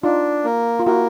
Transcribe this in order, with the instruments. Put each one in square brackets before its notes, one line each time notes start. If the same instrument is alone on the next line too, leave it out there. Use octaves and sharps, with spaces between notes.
[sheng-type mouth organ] D4 [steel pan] D#4 F4
[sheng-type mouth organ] A#3
[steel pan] F4
[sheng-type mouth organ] A#3 [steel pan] E4 F#4